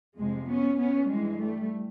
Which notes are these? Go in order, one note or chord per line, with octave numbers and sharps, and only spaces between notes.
F2 C3 F3 G#3
B3 C#4
B3 C#4
G2 E3 G3 G#3
G3 A3